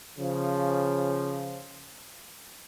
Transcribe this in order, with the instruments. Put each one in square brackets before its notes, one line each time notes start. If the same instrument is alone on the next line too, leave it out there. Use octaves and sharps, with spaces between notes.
[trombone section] C#3 F3